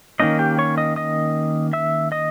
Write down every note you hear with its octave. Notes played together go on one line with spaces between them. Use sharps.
D#3 A#3 C#4 D#4 D#5
G4 G5
C#5 C#6
D#5 D#6
D#5 D#6
E5 E6
D#5 D#6